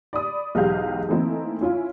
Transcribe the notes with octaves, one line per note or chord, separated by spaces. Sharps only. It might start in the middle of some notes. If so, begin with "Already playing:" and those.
D5 B5 D#6
B1 E2 G#2 G4 F5 G6
E3 A3 A#3 C4 D#4 E4
C#4 E4 F4